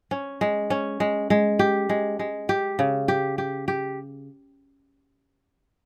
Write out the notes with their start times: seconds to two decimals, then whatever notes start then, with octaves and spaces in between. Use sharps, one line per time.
0.11 C#4
0.41 G#3
0.70 C#4
1.00 G#3
1.30 G#3
1.59 G4
1.89 G#3
2.19 G#3
2.49 G4
2.79 C#3
3.08 G4
3.38 G4
3.68 G4